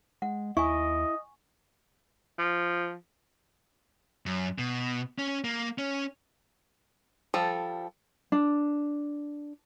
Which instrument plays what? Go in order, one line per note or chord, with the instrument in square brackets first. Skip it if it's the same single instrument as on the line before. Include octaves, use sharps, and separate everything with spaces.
[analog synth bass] G#3 [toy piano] F#5
[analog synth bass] D#2 [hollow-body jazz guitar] E4 [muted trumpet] D#5 [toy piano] G#5 C#6
[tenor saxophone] F3
[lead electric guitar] F#2
B2
C#4
A#3
C#4
[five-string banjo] F3 G3 A4
[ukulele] D4